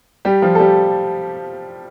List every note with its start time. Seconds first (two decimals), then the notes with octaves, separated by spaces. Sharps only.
0.25 G3 G4
0.42 F3 F4
0.55 A4
0.60 G3 G4